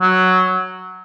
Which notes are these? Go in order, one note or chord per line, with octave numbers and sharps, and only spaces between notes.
F#3